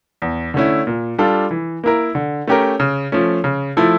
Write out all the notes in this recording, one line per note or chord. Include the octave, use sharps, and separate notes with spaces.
E2
D3 A3 C#4 E4
A#2
G3 D4 F4 A4
E3
A#3 E4 A#4
D3
A3 C#4 G4 A#4
C#3
F3 A3 C#4
C#3
F3 A3 E4 A4